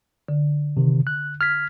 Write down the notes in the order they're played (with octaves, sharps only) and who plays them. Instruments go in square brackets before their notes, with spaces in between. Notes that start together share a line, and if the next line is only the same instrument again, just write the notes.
[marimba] D3
[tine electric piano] C3 D#3
F#6
F6 G#6 B6